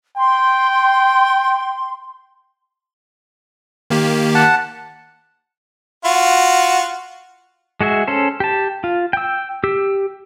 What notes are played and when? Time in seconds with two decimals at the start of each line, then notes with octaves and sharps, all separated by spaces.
0.17 G5 C6
3.90 D#3 A#3 G4
4.35 F#5 A5
6.05 F4 F#4
7.81 G#3 F#4 G#4 E5
8.07 C#4 A4 C5
8.40 G4 A5
8.84 F4
9.13 G5 E6
9.64 G4 E6